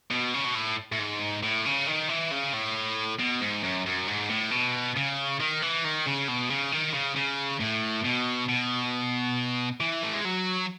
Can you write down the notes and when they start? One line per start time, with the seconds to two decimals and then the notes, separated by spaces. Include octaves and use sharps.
0.11 B2
0.34 C#3
0.44 B2
0.55 A2
0.92 A2
0.99 G#2
1.43 A2
1.65 C#3
1.87 D#3
2.09 E3
2.31 C#3
2.53 A2
3.19 B2
3.41 G#2
3.63 F#2
3.86 F#2
4.08 G#2
4.30 A2
4.51 B2
4.96 C#3
5.40 D#3
5.62 E3
5.85 D#3
6.06 C#3
6.28 B2
6.50 C#3
6.72 D#3
6.94 C#3
7.16 C#3
7.60 A2
8.04 B2
8.49 B2
9.81 E3
10.03 A3
10.14 G#3
10.25 F#3